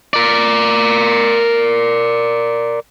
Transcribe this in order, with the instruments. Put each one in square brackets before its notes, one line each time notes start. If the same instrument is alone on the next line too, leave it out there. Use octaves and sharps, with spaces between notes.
[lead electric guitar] A#4 D5